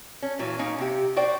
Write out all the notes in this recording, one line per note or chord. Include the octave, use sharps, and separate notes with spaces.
C#4
A#2 E3 F#3
A#3 C#4 D#4
C3 G4
F#4 C5 D5 G5